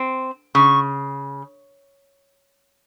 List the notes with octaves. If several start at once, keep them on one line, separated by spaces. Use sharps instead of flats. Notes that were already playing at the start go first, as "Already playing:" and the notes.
Already playing: C4
C#3 C#6